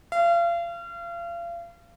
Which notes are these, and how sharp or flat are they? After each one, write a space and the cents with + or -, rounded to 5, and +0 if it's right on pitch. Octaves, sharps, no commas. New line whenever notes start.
F5 -35